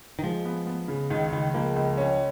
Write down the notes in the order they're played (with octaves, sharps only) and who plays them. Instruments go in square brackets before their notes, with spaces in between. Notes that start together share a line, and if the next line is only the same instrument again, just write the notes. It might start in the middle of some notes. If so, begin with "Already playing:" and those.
[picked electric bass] D#3
[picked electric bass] F3 [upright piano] G#3
[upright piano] B3
B3
C#3
[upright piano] C#2 [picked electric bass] D#3
[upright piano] C#2 [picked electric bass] D#3
[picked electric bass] F3 [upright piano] A#3
[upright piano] C#2
C#4